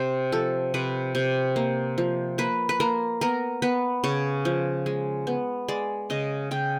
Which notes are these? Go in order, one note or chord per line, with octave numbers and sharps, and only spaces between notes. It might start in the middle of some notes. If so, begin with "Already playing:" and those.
Already playing: C3 C5
F3 A4
C3 B4
C3
A#3
F3
A#3 B4
B4
A#3 A#4
B3 A#4
B3 B4
C#3 C#5
F3
G#3
B3
G#3 D5
C#3 D#5
C#3 G5